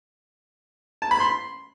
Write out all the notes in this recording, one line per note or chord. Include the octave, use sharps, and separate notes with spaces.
A5
B5
C6